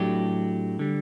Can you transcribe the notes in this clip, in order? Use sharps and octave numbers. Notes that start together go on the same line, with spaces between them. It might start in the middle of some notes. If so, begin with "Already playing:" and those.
Already playing: A2 F#3 A3 D4 G4
D3 G3